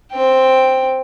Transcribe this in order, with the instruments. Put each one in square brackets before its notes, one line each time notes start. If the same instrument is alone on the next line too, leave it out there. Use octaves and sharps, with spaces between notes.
[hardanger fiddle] C4 G5